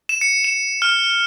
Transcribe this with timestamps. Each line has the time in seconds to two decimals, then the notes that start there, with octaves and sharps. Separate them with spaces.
0.09 E7
0.21 C#7
0.44 E7
0.82 F6